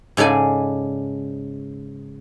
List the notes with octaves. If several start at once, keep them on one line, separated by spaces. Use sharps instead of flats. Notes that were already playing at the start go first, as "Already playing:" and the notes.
G#2 C#3 A4 D5 G#5